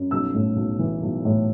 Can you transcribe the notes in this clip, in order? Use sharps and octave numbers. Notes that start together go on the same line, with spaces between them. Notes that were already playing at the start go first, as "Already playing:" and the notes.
Already playing: F#2
B1 E6
A2
B1
E3
B1
A2